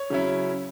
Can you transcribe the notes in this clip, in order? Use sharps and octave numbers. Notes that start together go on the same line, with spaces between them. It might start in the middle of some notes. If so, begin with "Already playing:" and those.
Already playing: C#5
C#3 F#3 C#4 E4